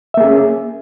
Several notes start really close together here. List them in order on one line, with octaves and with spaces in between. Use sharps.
E5 A#3 G#4 C#4